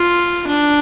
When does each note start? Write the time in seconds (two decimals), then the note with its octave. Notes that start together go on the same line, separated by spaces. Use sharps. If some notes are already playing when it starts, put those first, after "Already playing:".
Already playing: F4
0.47 D4